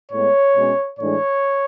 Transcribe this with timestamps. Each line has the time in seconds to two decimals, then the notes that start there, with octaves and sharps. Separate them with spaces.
0.12 A2 G#3 B3 C#5
0.55 B2 G#3 C#4
0.99 A2 E3 G#3 D4 C#5